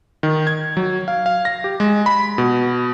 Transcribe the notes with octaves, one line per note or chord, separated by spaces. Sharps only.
D#3
G#6
F#3
F5
F5
A#6
G4
G#3
B5
B2